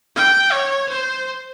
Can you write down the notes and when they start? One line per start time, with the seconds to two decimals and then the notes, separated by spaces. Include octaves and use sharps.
0.16 G5
0.53 C#5
0.89 C5